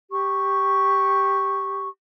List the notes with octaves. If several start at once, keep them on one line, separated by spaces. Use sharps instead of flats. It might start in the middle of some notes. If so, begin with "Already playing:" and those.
G4 C#6